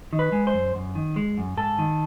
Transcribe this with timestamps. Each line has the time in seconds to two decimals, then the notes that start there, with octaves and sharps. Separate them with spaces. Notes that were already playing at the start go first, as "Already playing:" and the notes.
0.13 D#3
0.19 B4
0.32 G#3
0.47 C5
0.53 F#2
0.75 F#2
0.95 D#3
1.16 G#3
1.38 F#2
1.57 G#2 A4
1.79 D#3